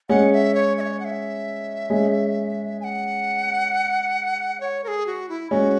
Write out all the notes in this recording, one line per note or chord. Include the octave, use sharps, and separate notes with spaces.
G#3 C#4 F#5
E5
C#5
E5
C#5
F#5
E5
G#3 C#4
G#5
F#5
C#5
A#4
G#4
F#4
E4
G#3 C#4 F#4